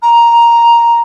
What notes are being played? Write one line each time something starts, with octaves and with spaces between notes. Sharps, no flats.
A#5